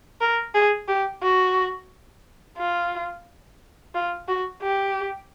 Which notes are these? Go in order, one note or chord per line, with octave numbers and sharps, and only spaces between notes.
A#4
G#4
G4
F#4
F4
F4
F#4
G4